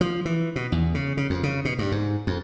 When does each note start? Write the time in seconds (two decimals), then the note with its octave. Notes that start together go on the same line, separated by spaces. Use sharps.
0.01 F3
0.25 E3
0.56 B2
0.72 E2
0.94 C#3
1.17 C#3
1.30 F2
1.43 C#3
1.65 B2
1.79 G2
1.92 G#2
2.27 F2